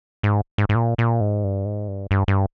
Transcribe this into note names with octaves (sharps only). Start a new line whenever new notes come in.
G#2
G#2
G#2
A#2
A#2
G#2
G2
G#2
G2
G2
G2